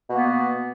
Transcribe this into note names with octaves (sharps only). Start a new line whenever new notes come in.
B2 A#3 B3